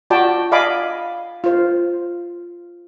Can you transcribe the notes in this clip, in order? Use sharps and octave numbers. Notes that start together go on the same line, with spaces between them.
F4 F#4 D5 G5 A5 B5
D5 D#5 F5 G#5 B5 D6
F4 C5